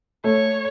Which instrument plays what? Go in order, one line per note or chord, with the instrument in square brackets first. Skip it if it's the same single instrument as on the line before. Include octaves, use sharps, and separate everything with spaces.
[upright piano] A3 [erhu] C#5